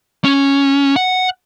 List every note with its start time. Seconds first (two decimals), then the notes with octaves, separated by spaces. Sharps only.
0.24 C#4
0.96 F#5